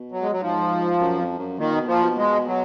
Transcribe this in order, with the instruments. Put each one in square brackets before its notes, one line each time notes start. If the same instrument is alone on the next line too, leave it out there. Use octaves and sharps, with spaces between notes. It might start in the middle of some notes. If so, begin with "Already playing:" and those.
Already playing: [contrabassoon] B2
[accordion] F#3
G#3
F#3
[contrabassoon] G#2 [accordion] F3
[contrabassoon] F#2
F2
F#2
[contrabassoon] A#2 [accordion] D#3
[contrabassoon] B2
[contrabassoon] A#2 [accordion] F3
[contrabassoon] B2
[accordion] G#3
F#3